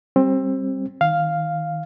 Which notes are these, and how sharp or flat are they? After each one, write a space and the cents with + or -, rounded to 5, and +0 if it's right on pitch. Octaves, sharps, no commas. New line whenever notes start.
G3 +0 C4 +25
D#3 +15 F5 +0